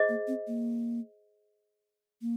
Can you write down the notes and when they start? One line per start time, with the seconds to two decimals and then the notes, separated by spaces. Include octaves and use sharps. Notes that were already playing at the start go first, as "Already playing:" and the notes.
Already playing: G#4 C5 D#5
0.09 A#3
0.28 C4
0.47 A#3
2.21 A#3